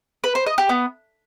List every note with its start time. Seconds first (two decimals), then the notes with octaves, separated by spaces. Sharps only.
0.24 B4
0.35 C5
0.46 D#5
0.58 G4
0.69 B3